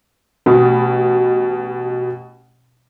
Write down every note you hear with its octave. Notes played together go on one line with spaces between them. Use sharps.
A1 B2 B5